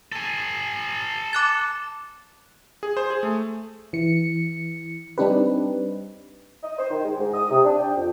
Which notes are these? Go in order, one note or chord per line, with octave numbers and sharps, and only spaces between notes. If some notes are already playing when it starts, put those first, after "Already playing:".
A4 G#5
D6 F#6 A6
G#4
C5
G#4
A3
E3 C#7
G3 C4 D4 D#4 G4 B4
D#5
C5
D#3
G#3
G#2
D#6
C3
D4
G5
F2